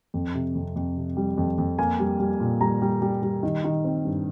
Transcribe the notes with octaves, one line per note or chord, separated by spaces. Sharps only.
F2
C3
F2
F2
C3
G3
F2
F2
A#3 G#5
G3
G3
A#2
G3 A#5
G3
G3
G3
D#3
D#3
C4
G2